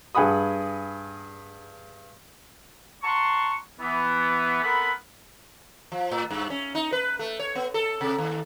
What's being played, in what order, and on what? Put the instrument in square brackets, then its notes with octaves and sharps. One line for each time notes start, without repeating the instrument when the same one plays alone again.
[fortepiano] G2 G#4 F#5 B5 D#6
[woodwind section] F#5 A5 A#5 C6 C#6
E3 B3
B3 C4 A4 A#4 F#5 B5
[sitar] F3
A2
G2
C#4
D#4
B4
A3
C#5
B3
A4
C3
D#2